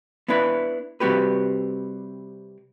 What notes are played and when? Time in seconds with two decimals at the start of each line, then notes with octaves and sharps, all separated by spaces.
0.28 B3 D4 E4 B4
1.00 C3 G3 C4 F#4 G4 B4